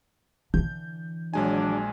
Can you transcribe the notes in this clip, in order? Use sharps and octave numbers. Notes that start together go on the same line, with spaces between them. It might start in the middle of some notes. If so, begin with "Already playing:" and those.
D3 E3 G6
A#1 F#3 G#3 D4 G#5